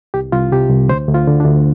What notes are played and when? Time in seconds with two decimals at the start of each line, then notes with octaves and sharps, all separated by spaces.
0.14 C2 G4
0.32 C2 F4
0.52 C3 G4
0.70 C2
0.89 D2 C5
1.09 D2
1.14 F4
1.27 D3
1.40 D4
1.45 D2